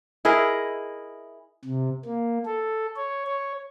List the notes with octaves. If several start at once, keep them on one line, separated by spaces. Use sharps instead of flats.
E4 G#4 A#4 D#5
C3
A#3
A4
C#5
C#5